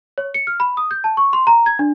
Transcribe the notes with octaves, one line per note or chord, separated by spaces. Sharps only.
C#5
C#7
F6
B5
D#6
G6
A5
C#6
C6
A#5
G#6
D4